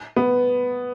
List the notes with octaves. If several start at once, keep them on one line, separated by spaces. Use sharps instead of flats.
B3